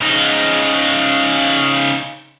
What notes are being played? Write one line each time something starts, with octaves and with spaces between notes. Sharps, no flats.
C#3 D#4